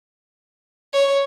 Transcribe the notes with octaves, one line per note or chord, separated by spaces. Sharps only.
C#5